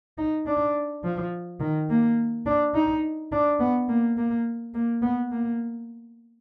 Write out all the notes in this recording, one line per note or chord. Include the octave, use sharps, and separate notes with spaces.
D#4
D4
F3
D#3
A#3
D4
D#4
D4
B3
A#3
A#3
A#3
B3
A#3